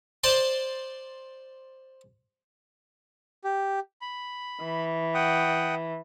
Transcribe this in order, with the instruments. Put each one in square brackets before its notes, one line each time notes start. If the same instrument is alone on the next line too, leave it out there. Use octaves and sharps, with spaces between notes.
[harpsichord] C5 D5 A5 C6
[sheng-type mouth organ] G4
B5
[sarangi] E3
[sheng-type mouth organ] F#5 G5 D#6